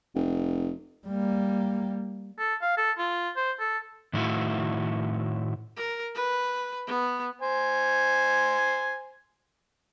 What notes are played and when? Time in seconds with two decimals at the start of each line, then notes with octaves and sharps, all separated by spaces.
0.15 F1
1.07 G3 A#3
2.39 A4
2.62 F5
2.77 A4
2.98 F4
3.36 C5
3.60 A4
4.13 A2 D#3 A3 C#4 E4 F#4
5.76 A#4
6.15 B4
6.87 B3
7.41 C5 G#5